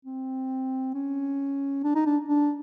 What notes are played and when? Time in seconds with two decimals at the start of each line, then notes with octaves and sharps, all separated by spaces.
0.05 C4
0.95 C#4
1.84 D4
1.95 D#4
2.06 D4
2.29 D4